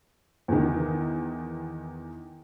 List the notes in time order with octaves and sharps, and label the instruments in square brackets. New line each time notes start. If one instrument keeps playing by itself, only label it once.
[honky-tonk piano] E2 D#3